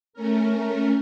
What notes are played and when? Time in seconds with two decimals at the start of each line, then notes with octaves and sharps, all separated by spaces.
0.13 A3 C#4 A#4